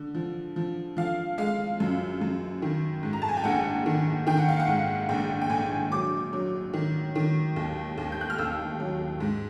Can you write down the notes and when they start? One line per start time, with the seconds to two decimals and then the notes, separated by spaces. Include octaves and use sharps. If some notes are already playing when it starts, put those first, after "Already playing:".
Already playing: D3
0.15 F3
0.56 F3
0.97 F3 F5
1.38 G#3 F5
1.80 F#2
2.21 F#2
2.62 D#3
3.03 G#2
3.13 A#5
3.22 A5
3.29 G#5
3.37 G5
3.44 A#1 F#5
3.86 D#3
4.27 D#3 G5
4.38 F#5
4.49 F5
4.60 F#5
4.67 G#2
5.09 A#1 G5
5.41 G5
5.50 A#1 G#5
5.92 F#3 D6
6.33 F#3
6.73 D#3
7.15 D#3
7.56 D#2
7.98 D#2
8.12 G6
8.21 F#6
8.30 F6
8.38 D#2 E6
8.80 F#3
9.20 G#2